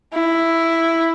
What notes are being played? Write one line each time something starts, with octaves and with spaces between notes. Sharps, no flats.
E4